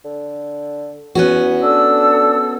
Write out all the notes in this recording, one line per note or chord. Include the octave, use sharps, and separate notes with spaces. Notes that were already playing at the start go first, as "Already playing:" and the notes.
D3
E2 B3 C#4 F#4
D4 A4 E6